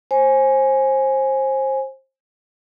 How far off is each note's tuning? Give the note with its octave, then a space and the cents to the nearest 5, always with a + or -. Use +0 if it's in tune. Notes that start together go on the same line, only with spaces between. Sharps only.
C5 +25 G#5 +0